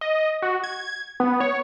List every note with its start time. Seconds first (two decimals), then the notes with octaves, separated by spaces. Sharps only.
0.01 D#5
0.42 F#4
0.64 G#6
1.20 B3
1.40 C#5